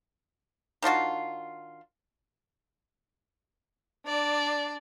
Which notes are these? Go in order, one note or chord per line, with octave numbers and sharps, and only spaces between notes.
D#3 D4 F4 F#4
D4 D5